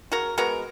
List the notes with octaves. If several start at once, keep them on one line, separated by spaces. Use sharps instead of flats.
C#3 F#4 A#4
G#3 B3 F#4 A#4